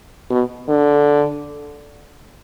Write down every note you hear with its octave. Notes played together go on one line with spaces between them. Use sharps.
B2
D3